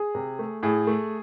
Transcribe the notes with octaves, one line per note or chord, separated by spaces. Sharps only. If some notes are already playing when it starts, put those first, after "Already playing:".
Already playing: G#4
C3
A3
A2 G#4
A3